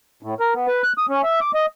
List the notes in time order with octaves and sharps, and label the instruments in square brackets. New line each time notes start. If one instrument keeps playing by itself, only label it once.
[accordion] A2
A#4
B3
B4
F#6
D#6
C#4
E5
D6
D#5